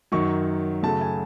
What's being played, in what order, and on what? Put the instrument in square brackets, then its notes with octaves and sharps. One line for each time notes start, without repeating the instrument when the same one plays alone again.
[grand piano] F#2 D#3 F#3 C#6
F#2 C#3 F#3 A3 A5
G#5